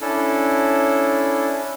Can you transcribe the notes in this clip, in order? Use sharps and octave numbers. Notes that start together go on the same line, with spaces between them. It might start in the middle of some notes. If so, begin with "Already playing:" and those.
C#4 D4 E4 A4